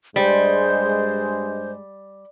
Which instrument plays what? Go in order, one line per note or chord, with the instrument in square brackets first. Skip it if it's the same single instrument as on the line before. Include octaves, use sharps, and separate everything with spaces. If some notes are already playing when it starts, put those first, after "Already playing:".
[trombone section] G2 G#3 [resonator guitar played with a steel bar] G3 [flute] C5